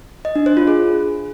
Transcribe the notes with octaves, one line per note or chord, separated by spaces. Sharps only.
D#5
D4
C5
F4
G#4